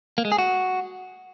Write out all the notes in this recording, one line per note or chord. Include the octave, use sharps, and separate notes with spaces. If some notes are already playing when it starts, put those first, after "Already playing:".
A#3
G#3
G#4
F#4